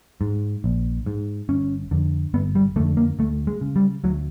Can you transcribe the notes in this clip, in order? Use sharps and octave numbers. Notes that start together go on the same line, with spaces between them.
G#2
A#1
G#2
G1 C#4
F2 D3
G1 B3
G3
F2 D3 A3
A#3
D2 A3
G#3
C#3
G3
D2 F#3